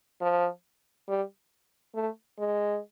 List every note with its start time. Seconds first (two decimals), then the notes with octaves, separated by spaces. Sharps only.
0.21 F3
1.08 G3
1.95 A3
2.39 G#3